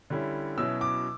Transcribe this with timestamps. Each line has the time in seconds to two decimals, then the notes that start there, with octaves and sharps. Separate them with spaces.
0.10 D3 G3 C#4 E4
0.57 B2 F#3 C#4 E4 E6
0.81 D6